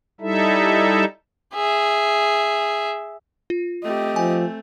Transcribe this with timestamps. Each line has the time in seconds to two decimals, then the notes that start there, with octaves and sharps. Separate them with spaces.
0.21 G3 D#4 E4 A4 E5
1.54 G#4 E5
3.50 F4
3.84 A3 C4 G4 D#5
4.16 F3 G#5